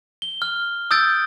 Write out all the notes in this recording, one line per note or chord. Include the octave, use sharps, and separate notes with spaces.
G7
F6
D#6 E6 G6 A6 D7